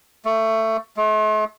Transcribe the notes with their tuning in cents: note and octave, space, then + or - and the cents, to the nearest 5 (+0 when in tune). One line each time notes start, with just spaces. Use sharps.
A3 +20
A3 -45